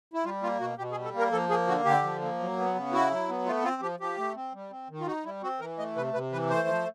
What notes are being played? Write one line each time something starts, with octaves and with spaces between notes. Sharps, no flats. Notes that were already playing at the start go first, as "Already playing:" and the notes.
E4
G3 F4
A#3 F4
B2 F#4
B2 G4
G#4
G3
A4
A#3
A#4
F3 A4
A#3 G#4
D3 F#4
D3 G4
F3
A#3
F#3
B3
C#3
E4 F#4
F#3
B3
A3 F4
C4 F4
F3 G4
F3 G4
A3
C4
G3
C4
D#3
F4
D#4 F#4
G3 E4
C4 F#4
E3 A#4
A3 D#5
C3 B4
C3 B4
E3 B4
A3 C5
F3